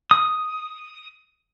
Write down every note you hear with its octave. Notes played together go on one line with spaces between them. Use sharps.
D#6